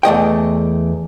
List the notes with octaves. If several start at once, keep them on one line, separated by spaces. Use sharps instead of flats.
E2 A3 D#5 G5